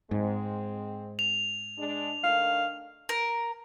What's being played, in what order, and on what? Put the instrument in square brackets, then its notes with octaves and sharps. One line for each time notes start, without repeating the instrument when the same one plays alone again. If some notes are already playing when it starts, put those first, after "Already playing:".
[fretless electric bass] G#2 [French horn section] G#3 C4
[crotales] F7
[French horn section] G#3 D4
[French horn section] D#3 A3 D4 [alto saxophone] F5
[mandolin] A#4